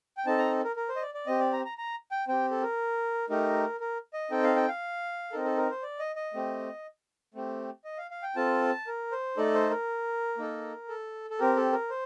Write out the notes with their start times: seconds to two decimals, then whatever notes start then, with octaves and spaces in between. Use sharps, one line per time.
0.17 G5
0.26 C4 D#4 A4 A5
0.38 A#5
0.64 A#4
0.76 A#4
0.89 C5
0.96 D#5
1.02 D5
1.14 D5
1.27 C4 G4 D#5
1.39 D5
1.53 A#5
1.65 A#5
1.78 A#5
2.11 G5
2.28 C4 G4 G5
2.51 A4
2.62 A#4
3.29 A3 D#4 G4 A#4
3.80 A#4
4.13 D#5
4.30 C4 D#4 A4 G5
4.43 F5
4.56 G5
4.68 F5
5.32 C4 D#4 A4 A#4
5.45 A4
5.57 A#4
5.70 C5
5.83 D5
5.99 D#5
6.16 D#5
6.34 A3 C4 G4
7.34 A3 C4 G4
7.84 D#5
7.98 F5
8.11 F5
8.23 G5
8.36 C4 F4 A4 A5
8.87 A#4
9.11 C5
9.37 A3 D#4 A4 D5
9.54 C5
9.70 A#4
10.37 A#3 D#4 A4
10.89 A4
11.30 A4
11.39 C4 G4 A#4
11.56 A4
11.72 A#4
11.90 C5